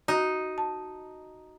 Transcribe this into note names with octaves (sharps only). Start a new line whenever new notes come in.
D#4 F#4
A5